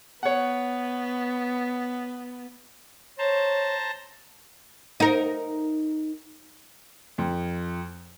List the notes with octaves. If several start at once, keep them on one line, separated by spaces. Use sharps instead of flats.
B3 C#5 F#5
C5 C#5 A5 A#5
D#4 A#4
F2